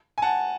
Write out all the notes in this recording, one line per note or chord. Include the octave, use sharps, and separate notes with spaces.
G#5
F#5 A5